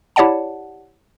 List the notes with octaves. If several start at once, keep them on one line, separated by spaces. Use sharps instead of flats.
E4 G4 C#5 D5 F#5 A5